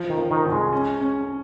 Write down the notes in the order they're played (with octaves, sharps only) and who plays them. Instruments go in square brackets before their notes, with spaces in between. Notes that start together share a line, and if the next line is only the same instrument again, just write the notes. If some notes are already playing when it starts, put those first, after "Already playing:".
Already playing: [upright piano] F3
[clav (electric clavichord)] D#3
[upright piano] F3
[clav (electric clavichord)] D#3
[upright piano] C2
[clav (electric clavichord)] G#3
[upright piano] C#4
C#4